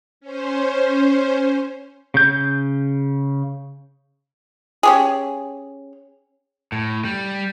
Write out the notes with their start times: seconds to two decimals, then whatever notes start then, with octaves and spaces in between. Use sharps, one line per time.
0.21 C#4 C5
2.14 C#3 G6
4.83 C#4 G4 G#4
6.72 A2
7.05 G3